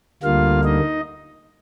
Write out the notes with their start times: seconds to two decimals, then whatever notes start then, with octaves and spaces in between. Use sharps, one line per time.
0.23 D2 D3 G3 A#3 F4 F5
0.64 D#4 D#5